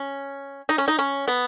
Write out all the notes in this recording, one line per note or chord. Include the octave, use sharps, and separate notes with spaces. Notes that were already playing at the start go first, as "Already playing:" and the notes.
Already playing: C#4
D#4
C#4
D#4
C#4
B3